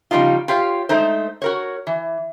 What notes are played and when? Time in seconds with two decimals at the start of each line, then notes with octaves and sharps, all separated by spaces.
0.11 C#3 F3 G3 D#4 F4
0.48 F4 G4 C#5 F5
0.89 G#3 A3 D#4 C5
1.42 F#4 A#4 C#5
1.87 E3